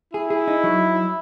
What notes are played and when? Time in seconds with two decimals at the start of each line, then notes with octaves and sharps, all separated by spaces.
0.14 E4 G#4
0.30 G#4
0.48 D#4
0.64 F#3